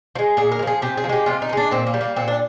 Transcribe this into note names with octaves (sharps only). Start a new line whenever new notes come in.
F3
G#3
A#2 G#4
A#4
G#3
F3 G#4
C3 G4
G#4
F3
G#3 G4
C3 F4
D#4
F3
G#3 D4
A#2 C4
A#3
G3
A#3
A#2 C4
D4